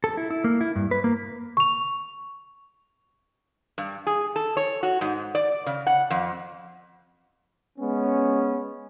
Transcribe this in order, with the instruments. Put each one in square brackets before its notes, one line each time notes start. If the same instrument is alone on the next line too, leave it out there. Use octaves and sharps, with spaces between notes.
[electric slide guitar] A4
E4
E4
A#3
E4
G2
B4
A#3
[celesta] C#6 F7
[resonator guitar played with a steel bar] G2
G#4
A4
C#5
F#4
G#2
D5
C#3
F#5
F2
[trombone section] G#3 B3 C#4